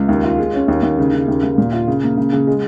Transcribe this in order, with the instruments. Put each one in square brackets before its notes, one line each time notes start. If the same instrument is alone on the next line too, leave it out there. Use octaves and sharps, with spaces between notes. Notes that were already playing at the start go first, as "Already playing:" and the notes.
Already playing: [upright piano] C#2
D#2
F4
G#3
C#4
D#2
D#2
C#3
C#3
D#2
D#2
A#2
F4
C#3
A#3
C#3
C#3
G#3